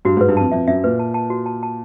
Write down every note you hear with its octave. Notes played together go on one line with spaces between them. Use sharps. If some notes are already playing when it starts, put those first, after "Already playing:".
G2 F#4
G#2 B4
G2
F2 A5
F2 E5
F#2 E5
A#2 B4
A5
A5
F#4
A5
A5